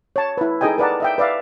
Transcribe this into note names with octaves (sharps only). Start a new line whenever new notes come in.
C#5 A5
E4 B4
D#4 G#4 A4 D#5 G5 G#5
A#4 B4 D5 F#5 A5
D#5 E5 G5
B4 D5 E5 F5